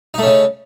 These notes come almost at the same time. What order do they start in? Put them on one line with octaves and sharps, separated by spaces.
D#4 A3 C#4 C#3